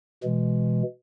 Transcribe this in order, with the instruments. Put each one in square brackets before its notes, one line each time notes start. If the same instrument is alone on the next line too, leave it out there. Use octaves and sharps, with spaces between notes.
[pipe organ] B2 E3 G#3